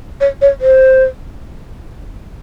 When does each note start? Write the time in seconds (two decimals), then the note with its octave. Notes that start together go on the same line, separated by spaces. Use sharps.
0.21 C#5
0.42 C#5
0.61 C5